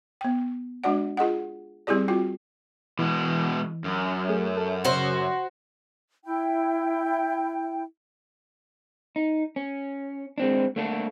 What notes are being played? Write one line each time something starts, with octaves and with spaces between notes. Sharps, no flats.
B3 G5
G#3 D4 F#4 D5 F#5
F4 G#4 D#5 F#5
G3 C4 E4 G4 G#4 D5
C4 F4 F#4 G5
B2 E3 G#3
F#2
A3 G#4
A4
C#3 F#4 C5
E4 G5
D#4
C#4
G#3 C4 D4
A3 A#3 D4 E4 A4